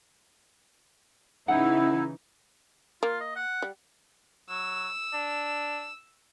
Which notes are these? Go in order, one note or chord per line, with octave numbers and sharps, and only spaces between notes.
C#3 E3 D#4 E4 F#5
A#3 F4
D#5
F#5
G3
F#3 E6
D4